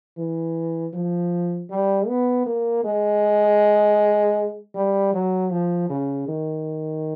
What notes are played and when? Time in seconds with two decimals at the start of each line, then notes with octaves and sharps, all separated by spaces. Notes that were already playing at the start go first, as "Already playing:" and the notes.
0.18 E3
0.93 F3
1.70 G3
2.08 B3
2.46 A#3
2.84 G#3
4.75 G3
5.14 F#3
5.51 F3
5.89 C#3
6.28 D#3